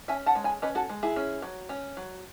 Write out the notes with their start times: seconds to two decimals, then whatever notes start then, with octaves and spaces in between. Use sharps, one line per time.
0.08 C#4 E5 G#5
0.26 F#5 A5
0.35 G#3
0.44 G#5 B5
0.62 C#4 B4 D#5
0.75 F#4 A4
0.90 G#3
1.03 E4 G#4
1.16 C#4
1.42 F#3
1.69 C#4
1.97 F#3